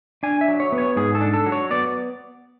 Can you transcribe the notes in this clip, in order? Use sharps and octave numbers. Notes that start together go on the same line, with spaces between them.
D4 G#5
E5
F#3
C#5
B3
C#5
G#2 G#4
A4
D4
A4
F#3
C#5
B3 D5